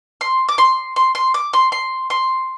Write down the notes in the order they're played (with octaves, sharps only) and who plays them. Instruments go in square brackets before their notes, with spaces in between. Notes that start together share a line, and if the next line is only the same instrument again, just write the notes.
[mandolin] C6
D6
C6
C6
C6
D6
C6
C6
C6